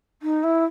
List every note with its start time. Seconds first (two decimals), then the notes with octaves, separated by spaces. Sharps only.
0.22 D#4
0.43 E4